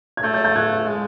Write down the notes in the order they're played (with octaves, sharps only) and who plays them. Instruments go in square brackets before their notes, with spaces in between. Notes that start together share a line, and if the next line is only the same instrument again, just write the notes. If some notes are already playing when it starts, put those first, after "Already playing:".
[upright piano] G#6
[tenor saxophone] A3 [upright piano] G6 A6
[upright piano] G6 A6
G6 A6
F#6 G#6
[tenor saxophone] G#3